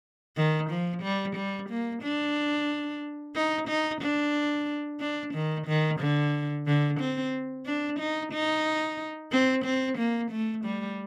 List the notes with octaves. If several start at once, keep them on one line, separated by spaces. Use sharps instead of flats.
D#3
F3
G3
G3
A#3
D4
D#4
D#4
D4
D4
D#3
D#3
D3
D3
C4
D4
D#4
D#4
C4
C4
A#3
A3
G3